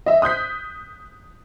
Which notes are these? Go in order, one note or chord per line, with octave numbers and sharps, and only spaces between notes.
D#5 E5
D#6 F#6 G6 B6